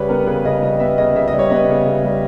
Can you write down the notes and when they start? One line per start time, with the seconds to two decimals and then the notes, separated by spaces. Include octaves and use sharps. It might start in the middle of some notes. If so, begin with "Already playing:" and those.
Already playing: C#3 G3 B4 C#5
0.09 B3 A#4
0.27 C#3 B4
0.44 C#3 D#5
0.63 G3 D#5
0.80 B3 E5
0.98 C#3 D#5
1.15 C#3 E5
1.28 D#5
1.33 G3
1.39 C#5
1.50 B3 D#5
1.69 C#3
1.86 C#3
2.05 G3